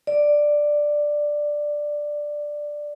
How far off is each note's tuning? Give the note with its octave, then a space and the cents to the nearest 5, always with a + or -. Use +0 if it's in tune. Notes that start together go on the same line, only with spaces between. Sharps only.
D5 +5